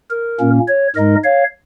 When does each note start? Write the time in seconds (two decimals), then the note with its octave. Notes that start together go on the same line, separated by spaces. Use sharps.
0.11 A#4
0.40 A#2 A#3 C#4
0.68 C#5
0.95 G#2 G#3 D#4 A#4 D#5
1.24 C#5 F5